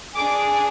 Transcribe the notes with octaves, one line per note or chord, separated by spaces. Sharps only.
D4 G#4 D6